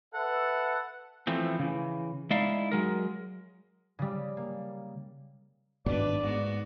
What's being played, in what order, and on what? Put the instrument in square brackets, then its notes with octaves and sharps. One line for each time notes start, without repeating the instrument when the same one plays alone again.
[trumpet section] A4 B4 E5 [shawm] F#5
[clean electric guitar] E3 F3 A3 C4
C#3 E3
G#3 D#4 E4 D5 F5
F#3 G#3 A#4
[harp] C#3 G3
A#3
[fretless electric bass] G#1 G2 B2 [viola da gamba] D4 B4 [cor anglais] D5
[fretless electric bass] G#2 [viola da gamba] G#3 B3 F#4